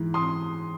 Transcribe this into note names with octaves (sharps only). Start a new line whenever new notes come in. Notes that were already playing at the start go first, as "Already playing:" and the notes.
Already playing: G#2 E3
C6 D#6